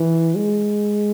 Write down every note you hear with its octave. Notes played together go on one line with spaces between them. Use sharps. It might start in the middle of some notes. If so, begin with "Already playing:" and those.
Already playing: E3
G#3